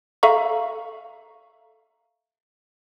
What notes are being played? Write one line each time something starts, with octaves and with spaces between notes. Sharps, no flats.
A4 E5 F5 A#5 C#6